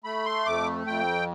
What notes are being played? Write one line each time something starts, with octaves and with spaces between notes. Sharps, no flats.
A3 B5
C6
F2 D6
F2 G5